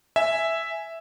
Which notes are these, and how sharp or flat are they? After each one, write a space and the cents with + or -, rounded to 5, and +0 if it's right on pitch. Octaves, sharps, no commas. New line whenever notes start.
E5 +0 G#5 +0